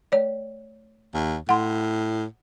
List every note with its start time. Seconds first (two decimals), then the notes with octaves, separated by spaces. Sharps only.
0.12 A3 C#5 D5
1.14 D#2
1.49 A2 F#5 C6